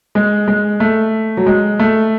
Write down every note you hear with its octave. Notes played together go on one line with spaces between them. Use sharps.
G#3
G#3
A3
F#3
G#3
A3